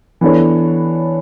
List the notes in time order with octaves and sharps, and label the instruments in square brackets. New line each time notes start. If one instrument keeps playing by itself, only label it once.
[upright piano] E3 B3 D4 A4 C#5